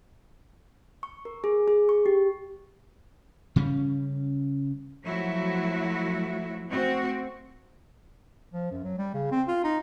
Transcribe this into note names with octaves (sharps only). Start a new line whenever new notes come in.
C#6
A#4
G#4
G#4
C#6
G4
C#3 G3 C#4
F3 F#3 A3 E4 F#4
A3 C4 F#4
F3
F#2
F#3
G3
C#3
C4
F4
D#4